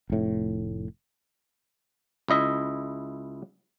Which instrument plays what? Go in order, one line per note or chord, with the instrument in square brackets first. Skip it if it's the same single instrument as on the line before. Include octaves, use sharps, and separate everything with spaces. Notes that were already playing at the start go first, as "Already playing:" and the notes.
[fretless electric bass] F1 A2
[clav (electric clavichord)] C#2 E4 D#5 E5